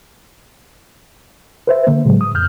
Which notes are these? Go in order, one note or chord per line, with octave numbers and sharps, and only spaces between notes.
B4 C5 E5
D3 A#3
A2 C#3 F#3 G#3
D#6
F2 F6 G6